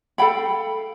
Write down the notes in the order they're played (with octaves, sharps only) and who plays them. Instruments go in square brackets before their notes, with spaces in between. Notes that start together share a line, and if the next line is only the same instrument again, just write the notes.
[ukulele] A4 F5 G5 B5